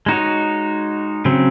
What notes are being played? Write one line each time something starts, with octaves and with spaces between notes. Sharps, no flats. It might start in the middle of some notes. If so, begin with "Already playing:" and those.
G#3 D#4 F#4 C#5
C#3 F#3 C4